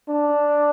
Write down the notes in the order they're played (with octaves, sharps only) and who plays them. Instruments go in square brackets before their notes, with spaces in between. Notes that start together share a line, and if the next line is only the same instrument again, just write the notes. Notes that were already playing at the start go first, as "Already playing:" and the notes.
[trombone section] D4